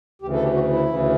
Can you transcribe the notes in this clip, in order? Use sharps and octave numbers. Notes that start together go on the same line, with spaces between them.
D2 C#3 E3 G4
A4
G4
F#4
E4
D2 C#3 E3